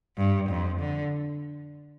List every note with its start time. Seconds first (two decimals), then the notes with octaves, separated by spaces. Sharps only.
0.18 G2
0.50 F2
0.80 D3